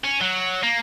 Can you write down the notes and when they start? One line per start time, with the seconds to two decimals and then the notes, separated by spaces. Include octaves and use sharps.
0.04 C#4
0.21 F#3
0.63 A#3